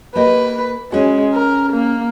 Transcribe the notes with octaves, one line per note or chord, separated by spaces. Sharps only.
A#3 G4 B4 D#5
G#3 C#4 F#4
A#4
A#3